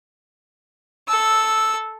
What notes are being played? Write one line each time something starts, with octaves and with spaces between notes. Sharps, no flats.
A4 E6